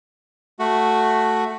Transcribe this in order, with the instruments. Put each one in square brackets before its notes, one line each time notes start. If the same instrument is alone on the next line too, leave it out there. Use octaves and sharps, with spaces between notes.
[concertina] A3 F#4